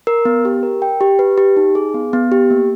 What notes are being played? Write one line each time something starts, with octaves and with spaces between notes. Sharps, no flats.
A#4
B3
G4
A#4
G5
G4
B4
G4
D#4
G#4
B3
B3
G4
A#3